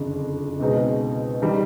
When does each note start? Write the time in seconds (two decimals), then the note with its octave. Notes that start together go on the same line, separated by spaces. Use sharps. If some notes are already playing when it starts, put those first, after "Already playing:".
Already playing: F#1 F2 D3
0.59 C#2 B2 G#3 C4 D#4
1.42 D#3 G3